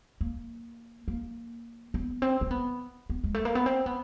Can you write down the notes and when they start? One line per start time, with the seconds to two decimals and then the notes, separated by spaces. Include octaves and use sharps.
0.21 A#3
1.08 A#3
1.94 B3
2.22 C4
2.41 C4
2.51 B3
3.10 B3
3.24 G#3
3.34 A3
3.45 A#3
3.55 B3
3.66 C4
3.86 B3